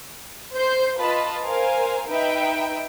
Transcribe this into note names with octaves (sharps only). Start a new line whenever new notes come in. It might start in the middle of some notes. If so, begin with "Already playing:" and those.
C5 G6 C7
F4 B4 D#5 A5 B5
A#4 C5 F5 G#5
D#4 B4 E5 G5